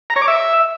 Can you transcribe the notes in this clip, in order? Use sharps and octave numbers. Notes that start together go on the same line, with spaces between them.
A#5
C#5
D6
E5